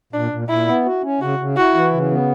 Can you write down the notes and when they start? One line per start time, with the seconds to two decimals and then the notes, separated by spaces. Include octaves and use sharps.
0.13 A#2 D4
0.31 A#2
0.48 A#2 E4
0.66 B3
0.86 F#4
1.03 C#4
1.21 C#3 F#4
1.39 C#3
1.57 E4 F#4
1.75 E3
1.93 C#3
2.11 B3